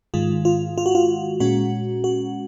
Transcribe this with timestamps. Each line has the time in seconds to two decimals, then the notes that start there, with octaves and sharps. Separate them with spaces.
0.14 G#2 D#3 G#3 F4
0.45 F4
0.78 F4
0.86 F#4
0.95 F4
1.40 A#2 G#3 C#4 F#4
2.04 F#4